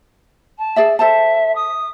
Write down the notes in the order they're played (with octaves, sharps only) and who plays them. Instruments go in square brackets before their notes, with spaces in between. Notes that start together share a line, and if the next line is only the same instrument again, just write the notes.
[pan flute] A5
[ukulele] G#4 D5 E5
[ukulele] A4 C5 A5 [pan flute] E5
[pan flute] D#6